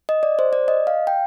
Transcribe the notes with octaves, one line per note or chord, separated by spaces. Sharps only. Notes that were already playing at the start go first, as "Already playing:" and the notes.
D#5
D5
C5
D5
D#5
F5
G5